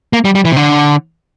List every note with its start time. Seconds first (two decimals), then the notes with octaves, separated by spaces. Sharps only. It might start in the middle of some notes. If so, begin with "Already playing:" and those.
0.13 A#3
0.25 G3
0.35 G3
0.45 E3
0.52 C3
0.57 D3